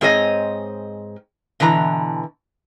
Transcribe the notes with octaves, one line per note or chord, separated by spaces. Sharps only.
G#2 C4 G#4 C#5 D#5
B2 D3 E3 A#5